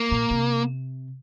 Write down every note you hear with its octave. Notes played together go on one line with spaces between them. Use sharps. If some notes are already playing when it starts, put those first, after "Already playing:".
Already playing: A#3
A#2
C3